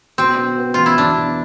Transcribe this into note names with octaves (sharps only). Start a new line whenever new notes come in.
B2 C4
B2
B3
E2 F4
E4
E2 D4
B2